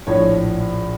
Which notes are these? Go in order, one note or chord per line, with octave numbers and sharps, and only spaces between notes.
A#1 A2 F3 C#5